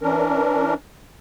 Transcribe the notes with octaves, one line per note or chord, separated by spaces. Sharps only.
E3 C#4 D4 A#4